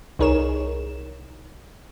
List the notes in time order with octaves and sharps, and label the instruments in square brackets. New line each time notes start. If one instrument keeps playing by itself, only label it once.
[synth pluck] C2 D#4 G#4 A#4 C#5 E7